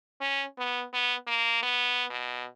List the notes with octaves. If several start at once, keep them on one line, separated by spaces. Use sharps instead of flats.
C#4
B3
B3
A#3
B3
B2